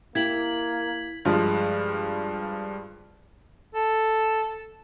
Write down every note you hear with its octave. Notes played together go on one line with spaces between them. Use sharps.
A#3 E4 G4 G#6 B6 F#7
G2 F3 G#3
A4